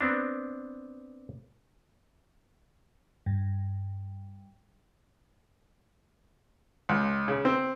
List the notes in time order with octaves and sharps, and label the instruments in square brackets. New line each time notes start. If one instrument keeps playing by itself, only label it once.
[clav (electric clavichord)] B3 C4 D4
[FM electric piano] G2
[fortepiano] C#2
C#3
C4